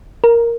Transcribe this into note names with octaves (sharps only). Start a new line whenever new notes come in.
A#4